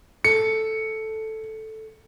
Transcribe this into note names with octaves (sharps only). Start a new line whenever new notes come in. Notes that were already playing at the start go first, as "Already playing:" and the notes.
A4 C#7